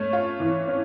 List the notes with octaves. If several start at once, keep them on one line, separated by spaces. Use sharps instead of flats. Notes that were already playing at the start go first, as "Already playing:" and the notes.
Already playing: A3 C#4
F4
E3
C#4